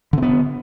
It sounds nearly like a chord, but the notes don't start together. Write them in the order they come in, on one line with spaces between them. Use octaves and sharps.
D3 C4 B3